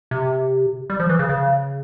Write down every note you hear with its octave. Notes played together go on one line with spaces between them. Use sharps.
C3
G3
F3
E3
C#3
C#3